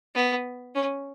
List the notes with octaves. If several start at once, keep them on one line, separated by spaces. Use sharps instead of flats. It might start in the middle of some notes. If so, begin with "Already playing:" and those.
B3
C#4